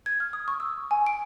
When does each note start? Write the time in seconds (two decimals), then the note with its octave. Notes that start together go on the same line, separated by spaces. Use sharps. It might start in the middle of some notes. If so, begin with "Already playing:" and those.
0.06 G#6
0.20 F6
0.33 D#6
0.48 C#6
0.60 E6
0.91 G#5
1.06 D7